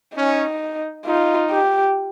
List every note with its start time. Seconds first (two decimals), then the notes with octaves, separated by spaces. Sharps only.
0.16 C#4 D#4
1.06 D#4 F4
1.51 G4